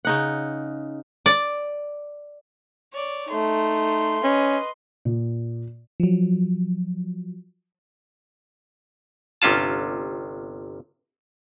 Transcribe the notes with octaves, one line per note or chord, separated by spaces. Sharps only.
C#3 D#4 F#5
D5
C#5 D5
A3 D#4 C6
C#4 B4 D#5
A#2
F3 F#3
G1 C3 C#4 F4 A5